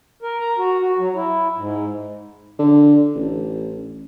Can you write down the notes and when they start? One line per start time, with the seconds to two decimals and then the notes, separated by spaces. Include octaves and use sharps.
0.22 A#4
0.40 A#5
0.58 F#4
0.82 F#4
0.99 F#3
1.15 E4
1.57 G#2
2.59 D3
3.15 A1